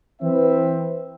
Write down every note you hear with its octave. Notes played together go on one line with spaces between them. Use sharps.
E3 C4 B4 E5